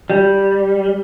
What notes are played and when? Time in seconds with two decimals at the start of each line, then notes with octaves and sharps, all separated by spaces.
0.10 G3